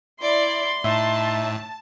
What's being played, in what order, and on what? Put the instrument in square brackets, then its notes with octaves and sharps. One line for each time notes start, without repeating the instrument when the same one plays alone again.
[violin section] E4 D5 [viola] C6
[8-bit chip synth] A2 [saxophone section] D#4 E5 [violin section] A5